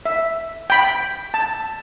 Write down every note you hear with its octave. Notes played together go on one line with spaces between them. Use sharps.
E5
G5 B5
A5